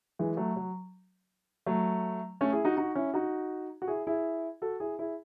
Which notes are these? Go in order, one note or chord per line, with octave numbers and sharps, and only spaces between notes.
E3 G#3
F#3 A3
F#3
F#3 A3
A3 C#4
E4 G#4
D#4 F#4
D#4 F#4
C#4 E4
D#4 F#4
F#4
E4 G#4
E4 G#4
F#4 A4
E4 G#4
E4 G#4